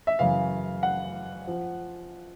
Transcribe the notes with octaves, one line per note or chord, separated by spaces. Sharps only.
E5
F#2 C#3 E3 F5
F#5
F3